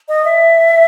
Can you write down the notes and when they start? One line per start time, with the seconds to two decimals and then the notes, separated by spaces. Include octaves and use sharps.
0.09 D#5
0.25 E5